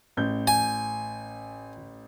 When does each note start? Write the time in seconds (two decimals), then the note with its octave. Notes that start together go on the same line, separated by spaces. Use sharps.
0.17 A1 G6
0.47 G#5